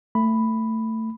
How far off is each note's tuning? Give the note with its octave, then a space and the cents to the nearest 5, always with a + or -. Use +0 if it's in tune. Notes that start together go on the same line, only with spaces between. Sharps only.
A3 +20 B5 +0